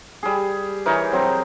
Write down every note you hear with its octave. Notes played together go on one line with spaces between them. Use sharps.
G3 G#4
E3 D#4 A#4 C#5
F#3 C4